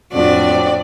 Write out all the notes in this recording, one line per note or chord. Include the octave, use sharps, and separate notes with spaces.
F2 A2 C4 D4 F#4 D5